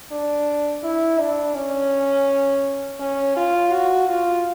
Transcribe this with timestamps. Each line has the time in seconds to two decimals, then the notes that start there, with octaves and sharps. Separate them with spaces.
0.12 D4
0.84 E4
1.20 D4
1.56 C#4
3.00 C#4
3.36 F4
3.72 F#4
4.09 F4